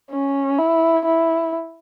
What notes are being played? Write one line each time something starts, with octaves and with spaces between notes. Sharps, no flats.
C#4
E4
E4